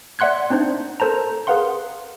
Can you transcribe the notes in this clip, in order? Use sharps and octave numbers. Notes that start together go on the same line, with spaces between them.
D5 E5 F#5 C6 F#6 G#6
C4 D4 D#4 C5
A4 A#4 C5 A5 A#5
G#4 A#4 B4 F5 F#5 C6